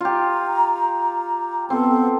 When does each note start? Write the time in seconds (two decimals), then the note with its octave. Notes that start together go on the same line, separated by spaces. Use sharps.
0.01 F4 G4 A#5
1.70 B3 C4 A4